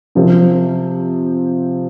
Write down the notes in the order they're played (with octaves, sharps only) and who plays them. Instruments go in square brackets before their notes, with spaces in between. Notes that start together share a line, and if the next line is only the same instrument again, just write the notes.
[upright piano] C3 F3 C4